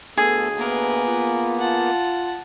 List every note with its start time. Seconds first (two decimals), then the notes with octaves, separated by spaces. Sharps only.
0.18 D2 A3 B3 G#4 A4
0.58 A#3 B3 A#4 B4
1.05 F4
1.60 F4 F#5 A5